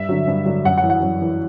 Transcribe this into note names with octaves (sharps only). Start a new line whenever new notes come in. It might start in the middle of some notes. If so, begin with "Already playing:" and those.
Already playing: G2 E5
D3 F#3
G2
D3 F#3
F#2 F#5
F#5
E3
F#5
F#2
E3